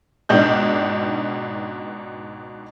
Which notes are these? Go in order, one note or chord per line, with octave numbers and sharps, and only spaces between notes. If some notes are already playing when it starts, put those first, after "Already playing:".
C#2 G#2 B2 D4 D#4 G6